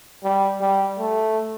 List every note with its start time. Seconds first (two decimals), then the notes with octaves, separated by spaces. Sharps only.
0.23 G3
0.61 G3
0.98 A3